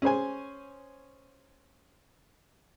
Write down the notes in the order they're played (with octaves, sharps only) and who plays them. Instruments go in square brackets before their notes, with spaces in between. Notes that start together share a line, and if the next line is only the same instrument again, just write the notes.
[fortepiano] C#4 G#4 C5 G#5